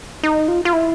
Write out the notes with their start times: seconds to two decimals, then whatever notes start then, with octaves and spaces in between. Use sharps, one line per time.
0.23 D#4
0.48 F4
0.65 F4
0.73 E4